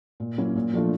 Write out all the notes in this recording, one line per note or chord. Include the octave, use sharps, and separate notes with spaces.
A#2
F#3 A#3 C#4 E4
A#2
F3 A3 D4 F4